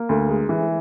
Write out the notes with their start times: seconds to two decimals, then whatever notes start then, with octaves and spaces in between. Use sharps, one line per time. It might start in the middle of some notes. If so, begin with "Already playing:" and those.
Already playing: A#3
0.09 D2
0.29 G#3
0.49 E3